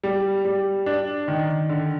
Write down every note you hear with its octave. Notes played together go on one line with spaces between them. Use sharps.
G3
G3
D4
D#3
D3